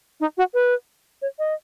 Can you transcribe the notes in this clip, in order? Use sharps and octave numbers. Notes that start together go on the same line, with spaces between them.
D#4
F#4
B4
C#5
D#5